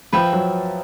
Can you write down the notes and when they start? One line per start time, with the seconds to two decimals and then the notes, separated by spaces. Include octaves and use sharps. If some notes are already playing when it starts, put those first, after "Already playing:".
0.13 F3 B4 E5 G5
0.33 F#3